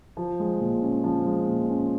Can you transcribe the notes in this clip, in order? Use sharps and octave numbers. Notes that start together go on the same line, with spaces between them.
F3
G#3
A#2
C#4
F3
G#3
A#2
C#4